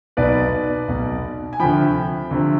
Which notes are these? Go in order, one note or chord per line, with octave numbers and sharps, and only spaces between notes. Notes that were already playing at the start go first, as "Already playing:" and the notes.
B1 B2 B4 D5
B1 B2
G#5
D2 C3 F3 G5 B5
D2 C3 F3